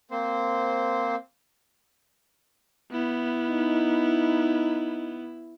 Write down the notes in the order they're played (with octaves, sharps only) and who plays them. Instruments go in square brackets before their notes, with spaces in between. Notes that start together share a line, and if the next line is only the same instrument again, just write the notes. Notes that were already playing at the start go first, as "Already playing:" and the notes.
[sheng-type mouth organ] A#3 C4 C5
[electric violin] B3 [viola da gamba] E4
[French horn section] D#4